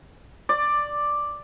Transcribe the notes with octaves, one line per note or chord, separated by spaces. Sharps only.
D5